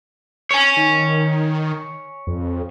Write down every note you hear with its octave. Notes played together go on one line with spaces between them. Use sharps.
C#5 G#5
D#3
F2